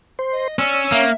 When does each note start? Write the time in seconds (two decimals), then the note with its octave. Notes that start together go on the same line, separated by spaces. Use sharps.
0.19 C5
0.32 D#5
0.59 C#4 D5 E6
0.92 A#3 E5